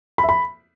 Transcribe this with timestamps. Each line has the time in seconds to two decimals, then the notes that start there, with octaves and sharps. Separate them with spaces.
0.18 B5
0.23 E5
0.29 B5